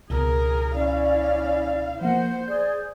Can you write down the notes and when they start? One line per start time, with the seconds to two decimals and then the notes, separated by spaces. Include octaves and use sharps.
0.10 C#2 B2 G#4 A#4
0.74 C#4 E4 D5 F5
2.01 F3 A#3 C5 F#5
2.48 G#4 D5 G6